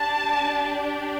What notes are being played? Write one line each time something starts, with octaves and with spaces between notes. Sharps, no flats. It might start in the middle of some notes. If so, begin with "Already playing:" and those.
Already playing: D4 G4 A5